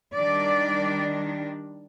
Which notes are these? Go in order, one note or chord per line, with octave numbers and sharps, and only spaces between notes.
D#3 G3 D4 D5